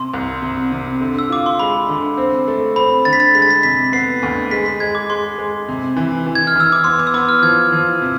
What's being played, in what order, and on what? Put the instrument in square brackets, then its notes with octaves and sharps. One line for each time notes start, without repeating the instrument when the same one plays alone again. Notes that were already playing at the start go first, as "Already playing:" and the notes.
Already playing: [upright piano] C3 [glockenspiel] C6
[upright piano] C2
C3
C3
D3
[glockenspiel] E6
[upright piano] F4 [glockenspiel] D6
[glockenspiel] C6
[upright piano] G#3 [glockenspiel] B5
[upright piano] D3
C4
A3
[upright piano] C4 [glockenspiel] B5
[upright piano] D3 [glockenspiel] A6
[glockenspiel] B6
A6
[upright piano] G#3 [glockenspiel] B6
[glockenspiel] A6
B6
[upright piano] C3 [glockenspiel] B6
[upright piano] B3 [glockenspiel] C7
[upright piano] D2
[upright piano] G#3 [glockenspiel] B6
[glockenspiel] B6
[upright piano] G#3 [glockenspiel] G#6
[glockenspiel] D6
[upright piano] G#3 [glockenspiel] C6
[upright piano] G#3
C3
E3
E3
[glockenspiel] G#6
F6
[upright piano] E3 [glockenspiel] E6
[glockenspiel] D6
[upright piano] B3 [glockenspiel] C6
[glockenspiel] D6
E6
[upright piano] B3 [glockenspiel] D6
[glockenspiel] F6
[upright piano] F3 [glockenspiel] G#6
[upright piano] F3
C3